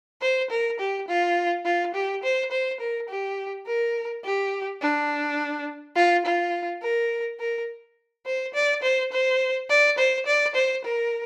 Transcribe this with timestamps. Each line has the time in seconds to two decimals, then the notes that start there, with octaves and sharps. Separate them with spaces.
0.22 C5
0.50 A#4
0.80 G4
1.08 F4
1.65 F4
1.95 G4
2.23 C5
2.51 C5
2.80 A#4
3.09 G4
3.67 A#4
4.24 G4
4.81 D4
5.96 F4
6.25 F4
6.82 A#4
7.40 A#4
8.26 C5
8.54 D5
8.83 C5
9.12 C5
9.70 D5
9.98 C5
10.26 D5
10.55 C5
10.84 A#4